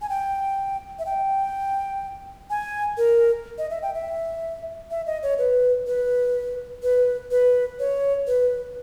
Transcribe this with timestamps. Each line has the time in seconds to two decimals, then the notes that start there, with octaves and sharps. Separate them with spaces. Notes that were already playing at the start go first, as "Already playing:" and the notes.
0.01 G#5
0.09 G5
0.99 E5
1.06 G5
2.50 G#5
2.97 A#4
3.58 D#5
3.70 E5
3.83 G5
3.94 E5
4.91 E5
5.06 D#5
5.23 C#5
5.38 B4
5.87 B4
6.83 B4
7.31 B4
7.79 C#5
8.27 B4